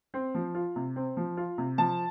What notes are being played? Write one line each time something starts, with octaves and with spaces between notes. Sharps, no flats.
C4
F3
F4
C3
C4
F3
F4
C3
F3 A5